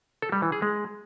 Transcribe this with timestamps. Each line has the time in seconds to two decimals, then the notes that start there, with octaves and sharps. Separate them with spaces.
0.22 A4
0.32 G3
0.42 E3
0.52 G#4
0.62 G#3